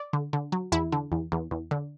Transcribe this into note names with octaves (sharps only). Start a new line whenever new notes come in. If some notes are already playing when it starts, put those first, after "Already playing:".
Already playing: D5
D3
D3
F#3
E2 E4
D3
E2
E2
E2
D3